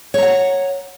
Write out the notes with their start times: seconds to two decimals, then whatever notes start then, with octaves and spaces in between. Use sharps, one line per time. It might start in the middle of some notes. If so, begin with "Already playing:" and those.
0.14 C#5
0.18 A#5
0.23 F#5